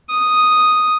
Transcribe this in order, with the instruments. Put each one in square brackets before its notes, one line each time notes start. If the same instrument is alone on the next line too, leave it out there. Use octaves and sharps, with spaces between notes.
[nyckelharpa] D#6